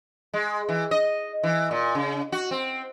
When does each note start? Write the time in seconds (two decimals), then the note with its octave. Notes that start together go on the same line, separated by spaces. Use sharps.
0.34 G#3
0.69 E3
0.91 D#5
1.43 E3
1.71 A#2
1.95 C#3
2.32 F#4
2.51 C4